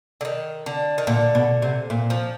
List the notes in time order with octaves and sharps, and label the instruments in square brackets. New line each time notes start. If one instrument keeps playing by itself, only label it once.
[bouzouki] D3
D#3
D3
D#3
[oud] A#2 [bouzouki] D3
[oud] B2
C3
A#2
[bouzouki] F3